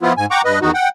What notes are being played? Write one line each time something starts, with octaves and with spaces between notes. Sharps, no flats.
F3 B3 E4 F4
G#2 G#5
F#5 G5 A#5 C#6 D6
G2 B4 D#5
E2 D#3 D#4 F#4
F#5 G5